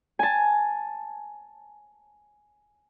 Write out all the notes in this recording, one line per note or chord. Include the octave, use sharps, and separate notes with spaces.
G#5 A5